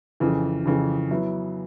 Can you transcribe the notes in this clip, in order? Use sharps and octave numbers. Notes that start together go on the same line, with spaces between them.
F2 C#3 E3
F2 C#3 E3
F#3 B3 E4